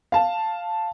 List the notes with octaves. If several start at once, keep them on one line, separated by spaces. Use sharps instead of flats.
F5 A5